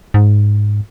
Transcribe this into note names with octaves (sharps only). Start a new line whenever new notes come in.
G#2